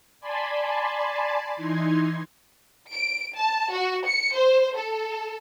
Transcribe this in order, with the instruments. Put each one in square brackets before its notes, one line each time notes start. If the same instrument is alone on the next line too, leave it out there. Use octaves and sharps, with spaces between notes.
[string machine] D5 G#5 A5 B5 C6
E3 D#4 C6 G#6
[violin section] D7
A5
F#4
C#7
C5
A4